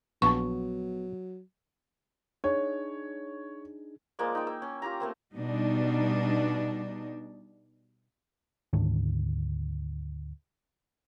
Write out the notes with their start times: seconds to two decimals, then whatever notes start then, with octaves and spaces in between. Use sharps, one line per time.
0.22 A#1 F#3 B3 A5 C#6
2.44 D4 D#4 G#4 C#5
4.19 F3 G#3 A#3 D5
4.35 D#4 G5
4.47 E6
4.62 C#4
4.82 F4 G4 A#4 A#5
5.00 A3 A#3 C4
5.35 B2 G3 D4 D#4
8.73 D2 G#2 D#3 D4